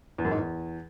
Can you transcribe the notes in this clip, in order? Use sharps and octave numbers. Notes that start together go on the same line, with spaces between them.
E2
F#2
G#2
E2